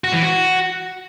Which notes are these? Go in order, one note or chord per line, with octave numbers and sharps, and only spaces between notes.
F#4
E3
F#4